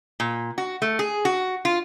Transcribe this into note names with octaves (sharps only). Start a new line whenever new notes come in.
A#2
F#4
A3
G#4
F#4
F4